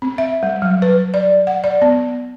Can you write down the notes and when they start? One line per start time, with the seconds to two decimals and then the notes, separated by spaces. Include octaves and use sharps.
0.02 C4
0.18 E5
0.43 G3
0.62 F#3
0.82 B4
1.14 D5
1.47 F#5
1.64 D5
1.82 B3